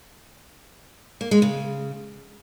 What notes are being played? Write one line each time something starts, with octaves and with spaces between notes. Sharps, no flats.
A#3
G#3
C#3